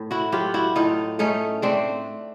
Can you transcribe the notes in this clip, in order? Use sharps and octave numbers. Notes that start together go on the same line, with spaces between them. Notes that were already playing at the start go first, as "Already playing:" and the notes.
Already playing: A2
E4 F#4
F#3 F4 G4
E4 F#4
A2 D#4 F4
A3 C#4 D#4
A3 C4 D4